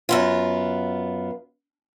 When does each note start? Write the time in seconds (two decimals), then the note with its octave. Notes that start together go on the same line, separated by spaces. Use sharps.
0.09 F#2 B3 F4